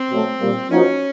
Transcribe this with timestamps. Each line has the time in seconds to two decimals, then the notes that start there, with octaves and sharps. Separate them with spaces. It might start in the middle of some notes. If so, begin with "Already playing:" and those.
Already playing: C4
0.10 B2 F#3 A3
0.40 A#2 G3 A#3
0.70 F3 A#3 C#4 D#4 F#4